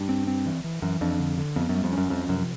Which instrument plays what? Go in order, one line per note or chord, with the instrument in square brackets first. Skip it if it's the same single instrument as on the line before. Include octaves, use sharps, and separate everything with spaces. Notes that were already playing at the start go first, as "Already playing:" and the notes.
Already playing: [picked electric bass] G2
[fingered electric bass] C4
C4
E3
E3
[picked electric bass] F#2 [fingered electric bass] E3
[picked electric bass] F2 [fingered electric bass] D4
[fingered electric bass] D3
D3
[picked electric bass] F2 [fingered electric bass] B3
[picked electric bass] F#2
[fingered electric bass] G3
[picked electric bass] F2
[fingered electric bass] C#4
[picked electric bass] F#2
[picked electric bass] F2 [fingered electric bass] F3
[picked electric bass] F#2 [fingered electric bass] C3